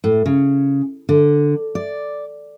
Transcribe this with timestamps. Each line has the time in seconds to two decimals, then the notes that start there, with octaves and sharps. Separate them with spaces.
0.04 A2
0.26 C#3
1.09 D3
1.75 D5